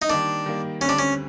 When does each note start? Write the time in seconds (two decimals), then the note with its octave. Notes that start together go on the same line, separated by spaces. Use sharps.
0.02 D#4
0.09 D#3 G3 A#3 D4
0.46 D#3 G3 A#3
0.81 D2 D3 G3 C4 C#4
0.89 D4
0.99 C#4